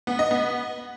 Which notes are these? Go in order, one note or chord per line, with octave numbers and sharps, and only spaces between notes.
B3
D#5
B3